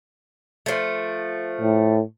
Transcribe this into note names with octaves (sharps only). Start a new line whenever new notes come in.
F3 A3
A2